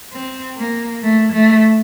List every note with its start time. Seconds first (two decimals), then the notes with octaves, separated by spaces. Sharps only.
0.12 C4
0.57 A#3
1.03 A3
1.33 A3